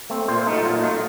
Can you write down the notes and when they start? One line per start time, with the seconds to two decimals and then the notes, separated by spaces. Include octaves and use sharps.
0.10 A3 C4
0.28 A#2 C5
0.38 F4
0.47 A3 D#4
0.51 F#3 F4
0.65 A#2 F4
0.75 D#4
0.83 F#3 A3 F4